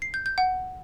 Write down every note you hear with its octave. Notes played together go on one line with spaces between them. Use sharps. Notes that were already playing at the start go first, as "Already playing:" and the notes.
C7
G6
G6
F#5